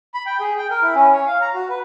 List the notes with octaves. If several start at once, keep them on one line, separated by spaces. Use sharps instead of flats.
B5
G5
G#4
G5
A#4
E4
C#4
C#5
F5
A#5
F#4
B4